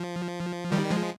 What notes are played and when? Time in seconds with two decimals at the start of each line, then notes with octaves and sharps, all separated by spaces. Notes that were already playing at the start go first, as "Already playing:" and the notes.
Already playing: F3
0.72 D#3 G3
0.90 F3 G#3